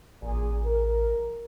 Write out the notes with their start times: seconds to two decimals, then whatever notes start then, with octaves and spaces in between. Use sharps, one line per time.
0.22 A1 A#2 G#4
0.64 A#4